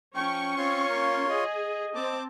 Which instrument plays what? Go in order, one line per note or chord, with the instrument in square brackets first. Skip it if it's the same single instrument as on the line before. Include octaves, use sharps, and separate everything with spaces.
[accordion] F3 [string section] C#4 C#6 [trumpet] G5
[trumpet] C4 [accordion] F4 C#5 C6
[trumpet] A#3
[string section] G#4 [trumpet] D#5
[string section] C4 A5 [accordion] D6